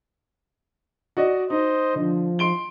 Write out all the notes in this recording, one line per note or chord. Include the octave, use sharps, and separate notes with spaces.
F#4 D5 D#5
D#4 C5 D#5
D3 F3
C6 D7 G7